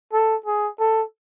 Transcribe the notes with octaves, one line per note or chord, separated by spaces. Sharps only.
A4
G#4
A4